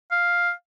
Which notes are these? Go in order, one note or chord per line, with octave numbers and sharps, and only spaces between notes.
F5